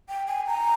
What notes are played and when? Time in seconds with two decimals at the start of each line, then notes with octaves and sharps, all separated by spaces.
0.09 G5
0.27 G#5
0.47 A#5